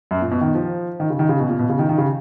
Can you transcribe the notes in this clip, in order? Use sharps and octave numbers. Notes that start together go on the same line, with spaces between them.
F#2
A#2
B2
D#3
F3
D#3
C#3
D#3
C#3
B2
A#2
B2
C#3
D#3
D#3
C#3